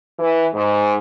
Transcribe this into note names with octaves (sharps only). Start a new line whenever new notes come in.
E3
G#2